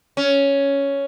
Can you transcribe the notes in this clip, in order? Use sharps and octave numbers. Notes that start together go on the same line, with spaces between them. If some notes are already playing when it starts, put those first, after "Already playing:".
C#4